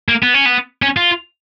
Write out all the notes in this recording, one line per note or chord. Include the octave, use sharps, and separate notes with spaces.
A#3
B3
C#4
B3
C#4
F4